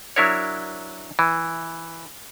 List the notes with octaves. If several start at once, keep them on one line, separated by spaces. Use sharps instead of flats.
F#3 D4 E4 A#4 C#5
E3